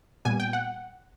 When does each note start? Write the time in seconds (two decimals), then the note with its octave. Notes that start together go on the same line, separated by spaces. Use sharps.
0.25 A#2 G3 B3 G#5
0.40 G5
0.53 F#5